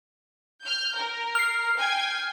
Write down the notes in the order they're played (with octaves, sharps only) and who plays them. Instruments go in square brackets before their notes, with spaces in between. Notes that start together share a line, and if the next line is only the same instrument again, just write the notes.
[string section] F6 G6
A#4
[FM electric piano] F6 C7
[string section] G5 G#5 G#6